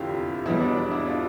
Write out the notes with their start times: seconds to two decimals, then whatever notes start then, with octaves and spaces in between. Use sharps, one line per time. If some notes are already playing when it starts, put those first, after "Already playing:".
Already playing: F1 E2 D3 E4 F4 G4
0.45 E1 E2 B2 G3 E4
0.60 D4
0.75 D4
0.92 E4
1.06 D4 F4